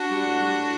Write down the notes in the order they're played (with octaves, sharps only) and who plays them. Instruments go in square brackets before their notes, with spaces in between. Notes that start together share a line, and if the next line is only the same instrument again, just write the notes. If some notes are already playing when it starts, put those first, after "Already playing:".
Already playing: [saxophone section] D4 F#4
G3
A2
G3
A2